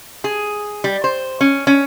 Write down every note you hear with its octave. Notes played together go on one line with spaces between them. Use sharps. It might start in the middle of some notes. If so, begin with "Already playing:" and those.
G#4
G3
C5
C#4
C#4